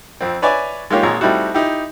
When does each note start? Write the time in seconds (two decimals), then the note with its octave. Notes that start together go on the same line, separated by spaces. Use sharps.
0.21 F2 C4
0.42 B4 C#5 D5 E5 G#5 D6
0.90 G#3 A#3 D#4 F4 G4 C#5
1.03 G#1 A#2 G#3 C#5 A#5
1.21 G3 A3 C4 D#4 E4 F#4
1.54 D#4 E4 G4